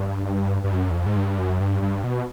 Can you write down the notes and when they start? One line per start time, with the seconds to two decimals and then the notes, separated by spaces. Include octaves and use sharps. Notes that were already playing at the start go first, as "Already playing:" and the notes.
Already playing: G2
0.64 G2
0.73 F#2
0.91 E2
0.95 F2
1.06 G#2
1.16 G2
1.38 F#2
1.60 G2
1.82 G2
2.04 B2